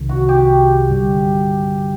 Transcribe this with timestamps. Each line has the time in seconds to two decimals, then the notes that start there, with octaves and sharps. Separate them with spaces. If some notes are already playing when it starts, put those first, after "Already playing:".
Already playing: C2 C3 D#3
0.09 F#4
0.29 G4
0.90 G2 D3 G3